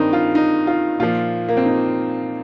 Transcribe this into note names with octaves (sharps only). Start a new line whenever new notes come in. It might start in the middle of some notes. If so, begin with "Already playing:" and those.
Already playing: G2 D#3 C4 D#4
F4
D#4
F4
A#2 F3 F4
A#3
C4
D#4